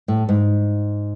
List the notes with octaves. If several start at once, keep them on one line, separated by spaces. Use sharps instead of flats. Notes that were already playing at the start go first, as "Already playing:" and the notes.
A2
G#2